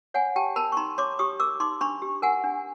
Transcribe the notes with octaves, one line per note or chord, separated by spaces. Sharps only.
C#5 F#5 G#5
G4 G5 A5
A#4 A5 B5
C#6
D#4 A#5 C6
C#5 C6 D6
G4 C#6 D#6
A#4 D6 E6
D#4 C6 D6
D4 B5 C#6
G4
A#4 F#5 G#5
D4